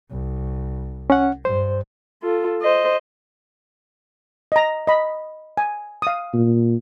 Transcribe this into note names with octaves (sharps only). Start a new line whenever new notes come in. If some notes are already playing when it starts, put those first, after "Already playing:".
C2
C#4 F#5
G2 C5
F4 A4
C5 D#5
D#5 A#5
D#5 B5
G#5
F5 D#6
A#2